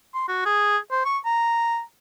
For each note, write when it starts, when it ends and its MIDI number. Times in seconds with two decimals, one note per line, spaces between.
0.14 0.25 84
0.28 0.42 66
0.46 0.78 68
0.91 1.02 72
1.05 1.18 85
1.25 1.81 82